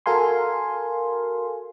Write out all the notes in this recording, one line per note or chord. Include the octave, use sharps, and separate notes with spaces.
F#4 A4 A#4 F5 G#5 C6